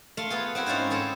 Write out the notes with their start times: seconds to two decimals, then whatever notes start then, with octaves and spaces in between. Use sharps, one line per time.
0.17 A3 F5 C6
0.30 B3 F4 G#4
0.55 C4 E4 F#4
0.66 G#2 C#4 E4 F4 C5
0.90 C4 G#4 A4 C5